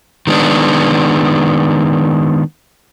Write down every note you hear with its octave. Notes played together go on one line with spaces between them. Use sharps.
D#3 G#3 B3 D4